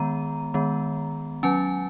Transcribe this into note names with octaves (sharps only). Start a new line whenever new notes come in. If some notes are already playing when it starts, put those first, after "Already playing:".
Already playing: D#3 G#3 B3 A#5
D#3 G#3 B3
F#3 C#4 G#5